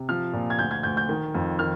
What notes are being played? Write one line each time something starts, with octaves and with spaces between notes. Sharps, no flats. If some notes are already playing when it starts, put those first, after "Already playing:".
Already playing: C3
F3 F6
A#2
G#6
D2 G6
G#6
D2 G6
G6
D#3
F2
D#3 F6